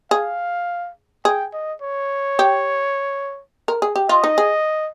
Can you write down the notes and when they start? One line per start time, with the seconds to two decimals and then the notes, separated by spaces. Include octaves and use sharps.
0.11 G#4 F5
1.25 G#4 G5
1.53 D#5
1.82 C#5
2.39 G4
3.68 A#4
3.82 G#4
3.96 G4
4.09 F4 D#5
4.24 D#4
4.38 G#4